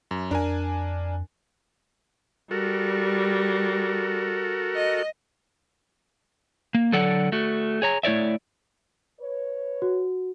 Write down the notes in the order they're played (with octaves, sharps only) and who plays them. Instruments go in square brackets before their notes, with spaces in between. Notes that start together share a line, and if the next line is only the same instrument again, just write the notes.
[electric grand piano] F#2
[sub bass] F2 [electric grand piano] D4 A#4 G#5
[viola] G3 [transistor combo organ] F#4 A4 A#4
[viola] D#5
[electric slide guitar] A#3
D3 F#3 A4 D5 F#5
A3 F#4
G#4 C#5 A#5
A3 E4 C#5 D5 E5
[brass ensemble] B4 C#5
[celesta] F#4